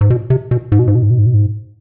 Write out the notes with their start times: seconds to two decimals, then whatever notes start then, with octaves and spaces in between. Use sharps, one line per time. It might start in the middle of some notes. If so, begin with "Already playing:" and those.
0.01 G#2
0.10 B2
0.30 C3
0.51 B2
0.72 G#2
0.79 B2
0.88 G#2
0.95 B2
1.03 G#2
1.10 B2
1.18 G#2
1.26 B2
1.34 G#2